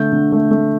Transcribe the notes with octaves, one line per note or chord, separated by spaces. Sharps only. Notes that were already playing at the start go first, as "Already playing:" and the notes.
Already playing: D3 A3 G6
D3
A3
A3